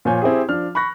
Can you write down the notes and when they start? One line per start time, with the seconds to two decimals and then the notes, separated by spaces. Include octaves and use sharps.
0.05 A#2 F3 C#5 G#5 G6
0.22 C4 E4 G4 G#4
0.49 F3 D4 F6
0.75 B5 C#6 F#6 A#6